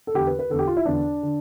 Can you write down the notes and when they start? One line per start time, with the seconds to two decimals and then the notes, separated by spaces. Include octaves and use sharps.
0.07 A4
0.14 E2 D3 G4
0.27 B4
0.39 B4
0.50 E2 D3 A4
0.59 G4
0.68 F4
0.77 E4
0.85 E2 D3 D4
1.23 D3